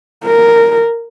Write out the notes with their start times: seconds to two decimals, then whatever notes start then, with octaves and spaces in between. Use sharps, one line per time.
0.24 A#4